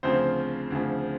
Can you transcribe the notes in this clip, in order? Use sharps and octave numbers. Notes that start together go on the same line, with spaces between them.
D2 C#3 F3 C4 C5
D2 C#3 F3